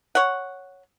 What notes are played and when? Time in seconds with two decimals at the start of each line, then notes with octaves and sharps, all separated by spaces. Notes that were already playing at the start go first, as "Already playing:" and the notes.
0.15 C#5 F#5